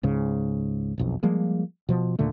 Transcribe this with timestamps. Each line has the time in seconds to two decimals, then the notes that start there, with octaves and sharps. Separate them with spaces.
0.03 C#2 G#2 C#3
0.98 E1 B1 F2
1.23 F3 G3 G#3 A#3
1.89 B2 F3
2.19 D#2 A#2 D3 A3